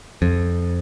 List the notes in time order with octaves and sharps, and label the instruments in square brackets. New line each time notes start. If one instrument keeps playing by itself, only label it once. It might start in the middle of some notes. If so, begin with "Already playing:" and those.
[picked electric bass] F2